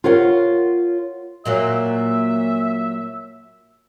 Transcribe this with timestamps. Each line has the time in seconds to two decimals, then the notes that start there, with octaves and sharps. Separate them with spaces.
0.04 F4 A#4 C#5 F#5
1.46 A#2 F#3 A#3 E5